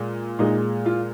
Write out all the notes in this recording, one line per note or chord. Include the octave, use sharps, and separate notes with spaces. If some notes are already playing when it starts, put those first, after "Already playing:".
Already playing: A#2 G#3
A#2 G#3 D#4
F4